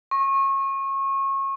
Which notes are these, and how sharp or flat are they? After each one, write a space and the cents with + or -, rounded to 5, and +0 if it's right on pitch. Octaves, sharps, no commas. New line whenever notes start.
C#6 -30